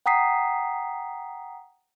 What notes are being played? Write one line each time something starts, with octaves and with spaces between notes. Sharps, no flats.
F#5 G5 A#5 D#6 B6 C7